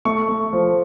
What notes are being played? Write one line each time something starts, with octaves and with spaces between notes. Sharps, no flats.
A3 C#6
A3
F3